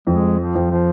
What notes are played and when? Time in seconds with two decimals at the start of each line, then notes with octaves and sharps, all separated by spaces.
0.07 F2 G#3
0.39 F3
0.55 F2
0.71 F3